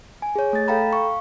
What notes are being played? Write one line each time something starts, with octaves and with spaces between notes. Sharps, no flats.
G#5
G#4 C#5
A3 A6
A4 F5 G5 A#5 B5
F5 C#6